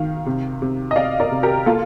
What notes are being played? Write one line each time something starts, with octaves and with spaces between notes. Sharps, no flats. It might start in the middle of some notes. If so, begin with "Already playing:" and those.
Already playing: D#3 F5
C3
C3
D#5
C3 D5 F5
A#4 D5
C3
G4 A#4
A#3 F4 A4